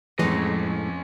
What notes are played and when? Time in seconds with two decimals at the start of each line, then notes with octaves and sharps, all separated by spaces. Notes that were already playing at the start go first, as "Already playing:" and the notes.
0.19 F2 A2 E3 G#3 C#4 D#5